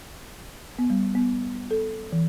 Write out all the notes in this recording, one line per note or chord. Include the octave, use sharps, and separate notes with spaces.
B3
G3
B3
A4
E3